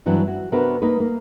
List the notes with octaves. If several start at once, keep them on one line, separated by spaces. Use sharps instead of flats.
G2 E3 F#3 C4 D4
F#4
C3 B3 D4 F#4 A#4 B4
A#3 D#4 B4
A#3